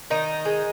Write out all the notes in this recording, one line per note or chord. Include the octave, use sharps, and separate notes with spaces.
D#3 D#4
G#3